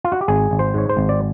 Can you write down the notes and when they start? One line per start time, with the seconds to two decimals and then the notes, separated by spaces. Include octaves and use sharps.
0.04 F4
0.12 F#4
0.21 G4
0.28 G#1 G#4
0.51 G#1
0.59 C5
0.74 G#2 C#5
0.89 C5
0.97 G#1
1.09 D5